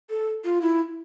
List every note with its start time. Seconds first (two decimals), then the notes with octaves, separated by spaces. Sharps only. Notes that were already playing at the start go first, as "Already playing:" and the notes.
0.10 A4
0.44 F4
0.61 E4